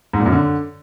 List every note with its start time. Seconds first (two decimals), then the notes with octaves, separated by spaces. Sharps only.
0.13 G#2
0.20 A#2
0.26 F#2
0.32 D3